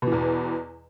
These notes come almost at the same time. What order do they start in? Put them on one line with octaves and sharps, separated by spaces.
B2 E3 E2